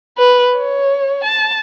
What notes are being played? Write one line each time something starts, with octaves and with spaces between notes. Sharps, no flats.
B4
C#5
A5